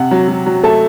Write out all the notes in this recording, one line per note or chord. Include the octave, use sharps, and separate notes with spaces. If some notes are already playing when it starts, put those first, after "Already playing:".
Already playing: C3 F#5
F#3
F#3
F#3
A3 A5